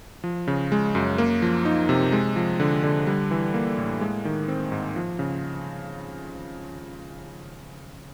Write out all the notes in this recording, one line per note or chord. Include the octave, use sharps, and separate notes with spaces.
F3
C#3
G#3
F#2
A#3
F3
D#4
C3
G#3
F3
D3
D3
G3
E3
A#3
A2
G#3
D#3
C4
G#2
F3
C#3